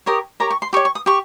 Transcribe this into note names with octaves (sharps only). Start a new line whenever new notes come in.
G4 A#4 C#5 D#6
G4 A#4 C#5 A#5
C#6
C6
G4 C#5 C#6
C#6
D#6
G4 C#6